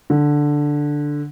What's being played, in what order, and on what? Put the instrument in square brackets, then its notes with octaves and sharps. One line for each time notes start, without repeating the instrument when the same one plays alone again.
[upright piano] D3